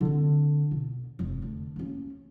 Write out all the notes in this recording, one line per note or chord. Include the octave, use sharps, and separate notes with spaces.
D3 C4
B2
F1 G2
D3
A#3 C#4